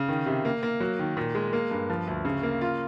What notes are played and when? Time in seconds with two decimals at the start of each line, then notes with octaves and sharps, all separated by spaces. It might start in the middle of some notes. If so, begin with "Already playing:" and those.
Already playing: C#3
0.09 D#3
0.26 C3
0.45 A#3
0.63 A#3
0.80 F#3
0.99 D#3
1.17 A#2
1.35 G#3
1.53 A#3
1.71 G2
1.90 F3
2.07 D2
2.25 C#3
2.43 A#3
2.61 F4